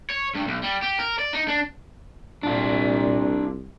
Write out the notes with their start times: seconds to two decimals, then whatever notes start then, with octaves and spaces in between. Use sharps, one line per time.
0.10 C#5
0.35 G2
0.47 B1
0.63 G3
0.82 G4
0.99 A#4
1.19 D5
1.33 D#4
1.48 D4
2.43 C2 A#2 D4 F4